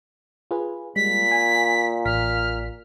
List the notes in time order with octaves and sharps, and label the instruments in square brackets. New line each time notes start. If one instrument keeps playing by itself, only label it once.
[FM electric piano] F4 G#4 B4
[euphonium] A#2 [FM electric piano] G3 G#3 [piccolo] B6
[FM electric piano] G#5
[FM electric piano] A1 B6 [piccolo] F6